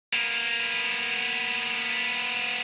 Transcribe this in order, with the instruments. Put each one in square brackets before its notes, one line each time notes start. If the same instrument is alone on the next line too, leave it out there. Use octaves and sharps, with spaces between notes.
[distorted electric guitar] A#3 B3